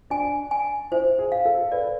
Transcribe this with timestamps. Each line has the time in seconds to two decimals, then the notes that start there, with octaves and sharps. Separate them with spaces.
0.10 D4 G#5
0.51 G#5
0.91 E4 C5
1.19 G#4
1.32 F5
1.45 A4
1.72 B4 D5